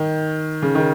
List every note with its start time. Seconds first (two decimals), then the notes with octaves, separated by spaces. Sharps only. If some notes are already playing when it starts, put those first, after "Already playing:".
Already playing: D#3
0.62 C#3
0.75 D#3